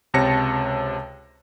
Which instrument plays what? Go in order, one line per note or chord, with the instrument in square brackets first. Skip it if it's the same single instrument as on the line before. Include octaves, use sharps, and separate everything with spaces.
[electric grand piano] C#2 C3 C#5 A5 A#6 C#7